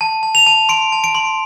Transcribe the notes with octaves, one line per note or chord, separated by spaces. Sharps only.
A5
A5
F7
A5
C6 D7
A5
D7
C6